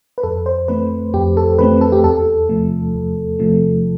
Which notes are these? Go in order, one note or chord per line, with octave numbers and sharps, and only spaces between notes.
B4
F2 A4
C5
E3 A3 C4 B4
F2 G4
A4
E3 A3 C4 B4
A4
G4
E2 A4
C3 F3 A3
E2
C3 F3 A3